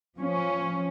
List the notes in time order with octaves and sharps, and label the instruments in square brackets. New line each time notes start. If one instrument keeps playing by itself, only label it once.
[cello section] F3 C#4